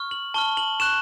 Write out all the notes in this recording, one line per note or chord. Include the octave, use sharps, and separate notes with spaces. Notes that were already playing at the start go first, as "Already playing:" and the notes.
Already playing: C#6 F6
F#7
A5 C#6 F6 G7
F#7
C#6 F#6 E7